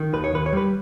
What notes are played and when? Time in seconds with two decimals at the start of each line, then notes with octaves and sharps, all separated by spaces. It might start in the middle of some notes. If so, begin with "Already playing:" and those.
Already playing: D#3
0.13 D#2 B4
0.24 C#5
0.33 D#2 B4
0.46 C#5
0.53 G3 B4